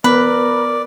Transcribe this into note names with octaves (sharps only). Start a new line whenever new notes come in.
B3 A#4 B4 D5